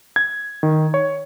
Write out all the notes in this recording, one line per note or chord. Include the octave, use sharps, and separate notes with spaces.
G#6
D#3
C#5